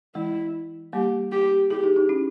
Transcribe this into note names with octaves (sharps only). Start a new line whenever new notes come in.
E3 G#3 E4
G3 A#3 G4
G4
E4 G4 G#4
D#4 G4
D#4 G4
C#4 E4